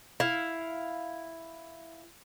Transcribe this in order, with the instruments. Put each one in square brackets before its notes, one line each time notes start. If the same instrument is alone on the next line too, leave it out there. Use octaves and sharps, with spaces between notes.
[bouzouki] E4 F5